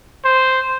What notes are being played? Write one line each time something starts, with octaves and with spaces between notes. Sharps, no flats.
C5